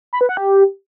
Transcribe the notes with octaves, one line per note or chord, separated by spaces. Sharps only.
B5
B4
F#5
G4